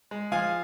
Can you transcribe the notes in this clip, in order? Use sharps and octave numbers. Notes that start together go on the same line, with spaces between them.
G#3
F3 F5 G#5